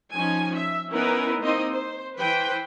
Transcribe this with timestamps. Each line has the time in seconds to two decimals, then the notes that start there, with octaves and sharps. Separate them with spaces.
0.12 F3 C#4 D#4 G#5
0.56 E5
0.90 B3 C#4 D#4 E4 A#4 B4
1.41 A#3 C4 D#4 C5 D#5
1.72 C5
2.17 E3 B4 C5 G5